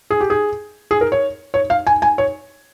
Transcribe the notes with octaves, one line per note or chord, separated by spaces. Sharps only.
G#4
G4
G#4
G#4
A#4
C#5
C#5
F5
G#5
G#5
C#5